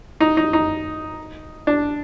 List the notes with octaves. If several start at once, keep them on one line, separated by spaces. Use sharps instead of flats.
D#4
D#4
D#4
D4